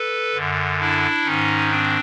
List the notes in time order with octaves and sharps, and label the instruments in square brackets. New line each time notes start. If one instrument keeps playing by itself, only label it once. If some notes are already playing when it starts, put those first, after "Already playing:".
Already playing: [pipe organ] A4 B4
F#2 D3
D4 E4
G#2 D#3 C#4 D#4
C4 D4